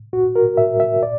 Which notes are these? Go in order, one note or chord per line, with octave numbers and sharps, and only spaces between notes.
A#2 F#4
A#4
E5
E5
A#2 D5